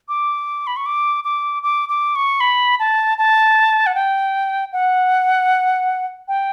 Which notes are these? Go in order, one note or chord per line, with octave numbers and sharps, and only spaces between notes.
D6
B5
C#6
D6
D6
D6
D6
C#6
B5
A5
A5
F#5
G5
F#5
G5